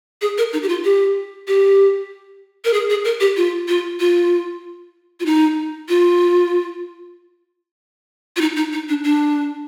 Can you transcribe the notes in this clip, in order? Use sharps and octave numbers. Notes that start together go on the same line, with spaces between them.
G#4
A#4
D#4
G4
F4
G4
G4
A#4
G#4
G#4
A#4
G4
F4
F4
F4
F4
D#4
F4
F4
D#4
D#4
D#4
D4
D4